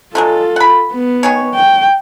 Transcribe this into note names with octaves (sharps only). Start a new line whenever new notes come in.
D3 F#3 G#3 F4 A4
F#5 B5
B3
D#3 G#4 C#5
G5